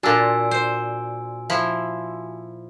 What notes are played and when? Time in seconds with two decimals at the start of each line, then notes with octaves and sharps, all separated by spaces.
0.03 A#2 D4 F#4 G#5 E6
0.51 C5
1.50 F3 E4